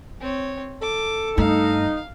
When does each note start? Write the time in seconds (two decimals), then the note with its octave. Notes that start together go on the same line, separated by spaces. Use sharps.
0.20 C4 C#5
0.82 A4 D6
1.38 G2 A3 D#4 F5